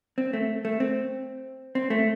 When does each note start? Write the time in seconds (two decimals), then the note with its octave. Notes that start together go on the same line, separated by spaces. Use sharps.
0.18 C4
0.33 A3
0.65 A3
0.80 C4
1.75 C4
1.90 A3